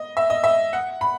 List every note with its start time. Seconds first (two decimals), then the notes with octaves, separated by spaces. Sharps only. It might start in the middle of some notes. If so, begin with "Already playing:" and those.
Already playing: D#5
0.17 E5
0.30 D#5
0.44 E5
0.73 F#5
1.01 B5